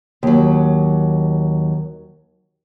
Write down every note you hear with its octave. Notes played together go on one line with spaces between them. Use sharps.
D#2 F#3